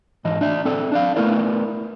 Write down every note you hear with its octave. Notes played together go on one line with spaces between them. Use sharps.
G#2 E3 D#5
D4 D5 E5
C4 A4 D5
D4 D5 F5
A3 B3 E4 A#4 D5